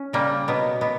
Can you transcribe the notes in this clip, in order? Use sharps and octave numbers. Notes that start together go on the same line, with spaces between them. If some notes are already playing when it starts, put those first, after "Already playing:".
Already playing: C#4
C#3 G3 A#3
B2 F#3 B3
B2 B3